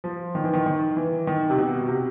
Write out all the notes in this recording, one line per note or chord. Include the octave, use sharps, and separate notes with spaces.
F3
D#3
E3
D#3
D#3
E3
D#3
C3
B2
C3